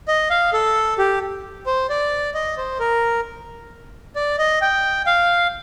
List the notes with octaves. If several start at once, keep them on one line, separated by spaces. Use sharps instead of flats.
D#5
F5
A4
G4
C5
D5
D#5
C5
A#4
D5
D#5
G5
F5